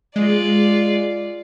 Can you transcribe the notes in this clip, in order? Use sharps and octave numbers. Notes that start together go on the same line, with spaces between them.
G#3 F4 D5